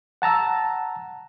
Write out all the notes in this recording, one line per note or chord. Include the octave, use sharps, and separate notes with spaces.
F#5 A5 A#5 E6